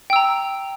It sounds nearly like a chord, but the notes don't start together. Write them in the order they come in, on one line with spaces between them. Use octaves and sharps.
G5 E6 A#5